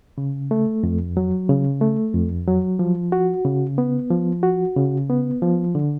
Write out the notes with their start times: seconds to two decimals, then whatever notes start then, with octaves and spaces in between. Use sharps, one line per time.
0.18 C#3
0.51 A3
0.83 F2
1.17 F#3
1.49 C#3
1.81 A3
2.14 F2
2.47 F#3
2.79 F3
3.12 F#4
3.45 C#3
3.78 B3
4.10 F3
4.43 F#4
4.76 C#3
5.10 B3
5.42 F3
5.75 D3